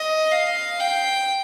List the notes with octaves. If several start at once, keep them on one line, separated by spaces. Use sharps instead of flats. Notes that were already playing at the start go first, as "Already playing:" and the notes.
Already playing: D#5
F5
G5